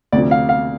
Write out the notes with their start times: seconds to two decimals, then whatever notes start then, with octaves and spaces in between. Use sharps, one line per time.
0.12 D2 C3 F3 D5
0.31 F5
0.49 F5